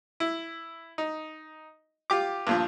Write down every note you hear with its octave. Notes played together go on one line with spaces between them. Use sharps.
E4
D#4
F4 G4 D6
G2 A#2 F3